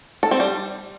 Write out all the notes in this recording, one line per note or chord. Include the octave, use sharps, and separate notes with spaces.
A4
C4
G3